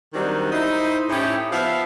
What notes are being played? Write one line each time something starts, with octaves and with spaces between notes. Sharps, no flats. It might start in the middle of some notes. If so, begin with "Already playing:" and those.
D#3 F#3 G3 C4 D4 D#4
D#4 E4 C5
A2 C#4 D#4 E4 G4 A4
F3 B3 F4 E5 F5